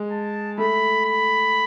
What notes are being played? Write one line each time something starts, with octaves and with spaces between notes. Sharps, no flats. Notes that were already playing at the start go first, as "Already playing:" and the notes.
Already playing: G#3
A5
A3 B5
B5